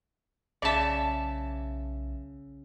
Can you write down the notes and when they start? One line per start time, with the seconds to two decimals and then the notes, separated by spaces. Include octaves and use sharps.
0.62 B1 C#3 D5 E5 A5